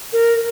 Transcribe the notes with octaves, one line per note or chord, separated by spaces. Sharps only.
A#4